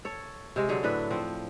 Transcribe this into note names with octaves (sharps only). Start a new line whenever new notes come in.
A4 C#5
C3 G#3
D3 F#3 G#4
A2 D4 B4 E5
F3 C4